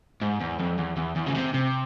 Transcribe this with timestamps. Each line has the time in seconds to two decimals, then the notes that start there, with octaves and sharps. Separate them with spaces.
0.22 G#2
0.41 E2
0.60 F2
0.78 E2
0.97 E2
1.16 E2
1.27 C#3
1.35 C3
1.54 C3